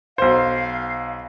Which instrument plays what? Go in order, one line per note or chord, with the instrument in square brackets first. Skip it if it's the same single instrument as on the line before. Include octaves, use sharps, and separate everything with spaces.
[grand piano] B1 C5 [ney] F5